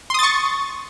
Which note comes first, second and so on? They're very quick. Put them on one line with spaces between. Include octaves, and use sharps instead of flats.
C6 D#6 A6 C#6